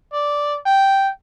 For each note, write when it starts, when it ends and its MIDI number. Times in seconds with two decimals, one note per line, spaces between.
0.13 0.58 74
0.66 1.09 79